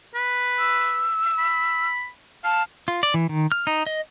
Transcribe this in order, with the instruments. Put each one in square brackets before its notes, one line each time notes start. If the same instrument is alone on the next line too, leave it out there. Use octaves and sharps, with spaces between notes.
[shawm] B4
[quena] E6
[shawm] B5
[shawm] F5 [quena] A5
[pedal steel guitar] F4
D5
E3
D#3
F6
D#4
D#5